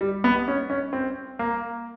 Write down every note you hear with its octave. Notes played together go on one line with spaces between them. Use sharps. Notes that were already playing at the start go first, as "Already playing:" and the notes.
G3
B3
C#4
C#4
C4
A#3